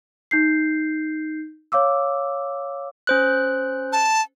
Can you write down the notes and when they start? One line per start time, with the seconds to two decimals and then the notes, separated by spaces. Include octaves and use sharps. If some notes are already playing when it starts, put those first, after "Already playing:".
0.31 D#4 G6 C7
1.72 C#5 F5 D6 E6
3.07 C#4 C5 F#6
3.92 A5